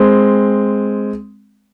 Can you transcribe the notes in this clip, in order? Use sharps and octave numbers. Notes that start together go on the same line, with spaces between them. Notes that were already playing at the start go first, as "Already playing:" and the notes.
Already playing: G#3 C4